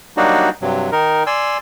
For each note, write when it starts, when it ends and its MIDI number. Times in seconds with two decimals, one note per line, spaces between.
0.17 0.50 54
0.17 0.50 55
0.17 0.50 58
0.17 0.50 62
0.17 0.50 63
0.17 0.50 66
0.61 0.90 43
0.61 0.90 48
0.61 0.90 54
0.92 1.23 51
0.92 1.23 63
0.92 1.23 70
1.27 1.58 74
1.27 1.58 80
1.27 1.58 84
1.27 1.58 88